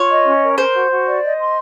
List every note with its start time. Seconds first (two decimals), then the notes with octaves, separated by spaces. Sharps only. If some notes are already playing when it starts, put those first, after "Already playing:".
Already playing: F4 C#5
0.09 D#5
0.26 C#4
0.42 A#4
0.58 A#4 C5
0.75 F#4
0.91 F#4
1.07 D5
1.23 D#5
1.39 C6